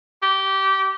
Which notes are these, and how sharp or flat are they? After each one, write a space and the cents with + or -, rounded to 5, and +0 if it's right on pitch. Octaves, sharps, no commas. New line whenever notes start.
G4 -20